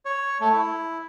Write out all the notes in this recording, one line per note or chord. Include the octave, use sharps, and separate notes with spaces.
C#5
A3
E4